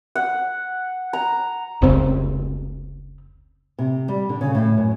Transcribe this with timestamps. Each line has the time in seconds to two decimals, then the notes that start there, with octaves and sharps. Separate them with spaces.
0.15 F#5
1.13 A#5
1.82 F1 C#2 C#3 C4
3.79 C3
4.08 G3
4.29 D3
4.41 C#3
4.55 A2
4.77 F#2